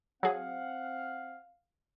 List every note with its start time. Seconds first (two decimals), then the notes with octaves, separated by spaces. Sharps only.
0.23 F#3 C4 G#4 F5 F#5